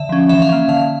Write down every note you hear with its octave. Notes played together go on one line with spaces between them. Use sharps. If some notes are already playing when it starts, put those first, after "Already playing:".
Already playing: D3 E5
F3 C#4
E3 E5
F5
A#3 C#4
D3 F5